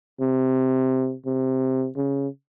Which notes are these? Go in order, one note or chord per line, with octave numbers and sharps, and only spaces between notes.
C3
C3
C#3